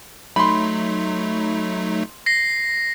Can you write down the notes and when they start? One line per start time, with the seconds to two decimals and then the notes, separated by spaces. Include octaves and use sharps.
0.36 F#3 A3 D#4 B5 C6
2.26 A#6 C7